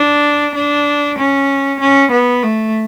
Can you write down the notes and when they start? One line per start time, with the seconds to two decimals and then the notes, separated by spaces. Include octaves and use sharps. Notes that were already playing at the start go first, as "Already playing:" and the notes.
Already playing: D4
0.55 D4
1.18 C#4
1.80 C#4
2.12 B3
2.43 A3